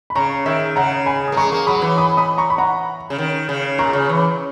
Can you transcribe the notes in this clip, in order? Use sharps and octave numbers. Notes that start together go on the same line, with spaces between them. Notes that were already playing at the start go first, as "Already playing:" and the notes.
B5
C#3 A#5 C#6
D#3 C#5 E5
C#3 F#5 A#5
G#5 B5
D#6
A#3
G#3 A#5 C#6
A#3
F#3 B5 D#6
E3
B5 D#6
B5 D#6
A#5 C#6
B5
F#5 A#5
C#3
D#3
C#3
A#2 A#5 C#6
C#3
E3